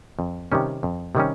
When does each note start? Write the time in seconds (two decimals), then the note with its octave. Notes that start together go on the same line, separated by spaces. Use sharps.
0.19 F2
0.52 C3 D#3 G3 C#4
0.83 F2
1.15 C3 D#3 G3 C#4